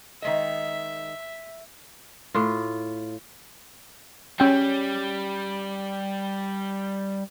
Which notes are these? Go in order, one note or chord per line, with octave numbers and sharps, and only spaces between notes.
D#3 G#3 D#5 E5
A2 F4
G3 C#4 G5